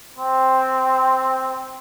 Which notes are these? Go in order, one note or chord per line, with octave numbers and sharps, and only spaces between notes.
C4